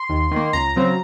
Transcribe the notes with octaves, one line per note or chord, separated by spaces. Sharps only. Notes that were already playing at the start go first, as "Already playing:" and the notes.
Already playing: C6
D#2
D#3 A#3
C#2 A#5
C#3 F#3 C4